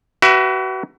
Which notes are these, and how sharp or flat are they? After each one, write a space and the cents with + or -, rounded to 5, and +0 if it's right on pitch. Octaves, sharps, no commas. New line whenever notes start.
F#4 +35 B4 +0 E5 +25